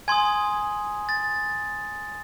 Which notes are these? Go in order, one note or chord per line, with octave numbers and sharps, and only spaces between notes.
G#5 C6 D#6 G#6
A6